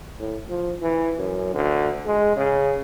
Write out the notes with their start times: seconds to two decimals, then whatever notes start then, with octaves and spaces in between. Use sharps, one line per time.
0.19 A2
0.49 F3
0.81 E3
1.19 F#2
1.54 D2
2.06 G#3
2.36 C#3